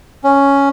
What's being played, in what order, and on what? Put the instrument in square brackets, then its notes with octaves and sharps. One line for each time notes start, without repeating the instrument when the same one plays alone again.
[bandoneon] C#4